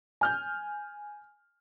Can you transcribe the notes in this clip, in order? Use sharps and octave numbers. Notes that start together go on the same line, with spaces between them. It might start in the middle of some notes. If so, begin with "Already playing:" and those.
G#5 F6 G6